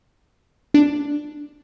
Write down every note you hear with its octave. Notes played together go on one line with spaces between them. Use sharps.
D4